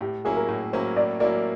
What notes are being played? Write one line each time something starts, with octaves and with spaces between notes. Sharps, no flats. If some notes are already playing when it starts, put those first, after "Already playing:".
A2 G4
F#3 A#3 C#4 E4 G#4
A#4
A2
F#3 A#3 C#4 E4 C5
A2 D5
F#3 A#3 C#4 E4 D5